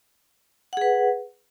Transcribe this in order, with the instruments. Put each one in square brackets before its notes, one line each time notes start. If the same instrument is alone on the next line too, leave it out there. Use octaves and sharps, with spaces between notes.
[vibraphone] F#5
G#4
B4